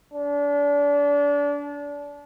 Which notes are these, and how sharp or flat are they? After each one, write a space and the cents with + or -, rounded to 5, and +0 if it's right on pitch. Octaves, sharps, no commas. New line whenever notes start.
D4 -30